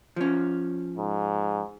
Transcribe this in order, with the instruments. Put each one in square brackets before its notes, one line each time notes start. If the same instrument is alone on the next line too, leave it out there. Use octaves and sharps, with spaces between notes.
[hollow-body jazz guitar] F3 C#4
[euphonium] G#2